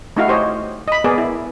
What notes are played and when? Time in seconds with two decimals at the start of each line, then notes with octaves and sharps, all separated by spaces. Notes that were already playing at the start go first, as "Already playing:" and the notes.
0.16 A3 D#4 E4 F#4 F5
0.28 G4 C5 C#5 D#5
0.88 D#5 B5
1.04 B3 G#4 A#4 D5
1.18 E4